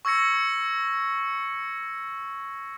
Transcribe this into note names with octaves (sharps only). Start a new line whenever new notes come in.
C#6 E6 G#6 A#6 C#7